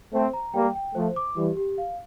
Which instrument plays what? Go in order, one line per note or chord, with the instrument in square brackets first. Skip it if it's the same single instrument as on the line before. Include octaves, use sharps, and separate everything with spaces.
[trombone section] A3 C4 [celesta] C5
[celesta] A#5
[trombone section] G3 A#3 [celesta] G5
[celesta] G5
[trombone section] F3 A3 [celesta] C5
[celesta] D6
[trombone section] E3 G3 [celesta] G4
[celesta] G4
F5